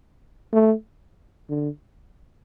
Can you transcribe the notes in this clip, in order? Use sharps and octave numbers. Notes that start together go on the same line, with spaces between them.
A3
D3